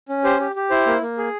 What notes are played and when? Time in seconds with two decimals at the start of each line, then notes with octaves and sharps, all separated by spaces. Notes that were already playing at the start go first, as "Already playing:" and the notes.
0.09 C#4
0.24 G4 C5
0.40 G4
0.56 G4
0.70 E4 C5
0.86 A#3
1.02 A#3
1.18 G#4